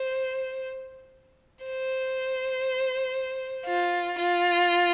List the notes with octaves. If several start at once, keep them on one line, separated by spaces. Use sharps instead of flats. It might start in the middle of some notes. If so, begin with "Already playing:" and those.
Already playing: C5
C5
F4
F4